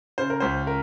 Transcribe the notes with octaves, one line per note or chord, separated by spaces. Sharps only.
C#3 C5
A#4
C#2 C5
A#4